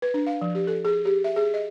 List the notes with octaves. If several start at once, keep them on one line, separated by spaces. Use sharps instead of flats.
B4
D4
F5
F3
G4
A4
G#4
G4
E5
G#4
D#5